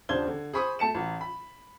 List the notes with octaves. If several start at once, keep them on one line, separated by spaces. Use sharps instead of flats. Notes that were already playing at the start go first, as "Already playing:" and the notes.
D#1 C#3 D4 C5 G#6 G7
D3
G#4 C5 B5 C#6 D#6
A3 A5 C#7 E7
A1
B5